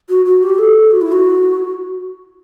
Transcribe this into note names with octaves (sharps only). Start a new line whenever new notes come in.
F#4
F#4
G4
A4
F#4
E4
F#4